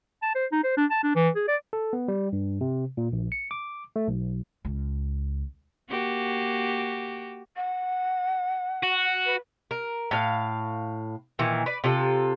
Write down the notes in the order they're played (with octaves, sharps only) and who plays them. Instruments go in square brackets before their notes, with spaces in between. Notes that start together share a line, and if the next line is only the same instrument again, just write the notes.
[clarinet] A5
C5
D#4
C5
D4
A5
D4
E3
G#4
D5
[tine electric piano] A4
B3
G3
G2
C3
A#2
A#1
C#7
D6
A3
B1
[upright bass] C#2
[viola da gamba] A#3 F#4 G4
[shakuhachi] F#5
[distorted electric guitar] F#4
[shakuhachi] B4
[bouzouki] A#4
A2 F5
A#2 D#3 E3
B4 D5
C3 F4 A4